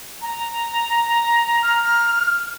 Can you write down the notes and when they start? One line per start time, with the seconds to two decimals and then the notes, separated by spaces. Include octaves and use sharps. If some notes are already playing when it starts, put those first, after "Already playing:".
0.22 A#5
1.63 F6